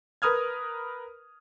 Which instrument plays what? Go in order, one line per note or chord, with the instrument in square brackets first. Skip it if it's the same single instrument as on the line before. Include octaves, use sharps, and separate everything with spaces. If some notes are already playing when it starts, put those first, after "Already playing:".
[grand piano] A#4 B4 D#6 F6 G#6